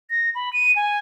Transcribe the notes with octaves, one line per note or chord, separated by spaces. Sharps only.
A#6
B5
D#7
G#5